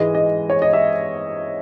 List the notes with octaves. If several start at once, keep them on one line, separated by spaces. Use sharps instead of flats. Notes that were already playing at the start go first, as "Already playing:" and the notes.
Already playing: G#2 E3 G#3 D#5
D#5
C#5
D#5
E5